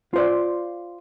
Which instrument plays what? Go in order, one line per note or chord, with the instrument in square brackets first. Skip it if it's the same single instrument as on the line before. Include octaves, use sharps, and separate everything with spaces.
[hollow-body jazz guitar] F4 C5 D5